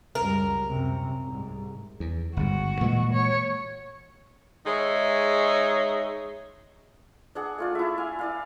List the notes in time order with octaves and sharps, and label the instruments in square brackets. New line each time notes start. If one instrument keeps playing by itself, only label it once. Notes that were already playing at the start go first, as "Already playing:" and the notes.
[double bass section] C#2 F#2 G3 [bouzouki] A#4
[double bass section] F#2 C3
C2 G#2
[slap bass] E2
[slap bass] G1 G#2 [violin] F#4
[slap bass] A#2 E3 G#3
[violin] C#5
[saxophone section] G#3 D#4 G#4 C#5 E5
[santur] D4 G#4 F#5
A3 F4 D5
E4 E5
F5 G#5
E4 D5 F5